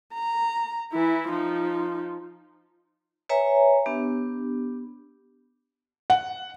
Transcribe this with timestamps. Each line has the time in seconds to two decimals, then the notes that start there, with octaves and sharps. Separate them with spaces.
0.14 A#5
0.93 E3 E4
1.28 F3 D#4
3.29 B4 C#5 E5 G#5 A#5
3.86 B3 D4 G4
6.10 F#5